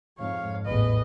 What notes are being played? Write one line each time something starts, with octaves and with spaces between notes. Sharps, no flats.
F2 G#2 C#5 F5
A1 E2 A2 B4 D#5